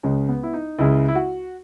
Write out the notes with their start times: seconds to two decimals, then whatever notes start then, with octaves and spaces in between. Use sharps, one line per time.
0.03 C#2 C#3 G#3 C#4
0.28 B3
0.43 E4
0.53 D#4
0.79 C#2 C#3 G#3 E4
1.08 E4
1.15 F#4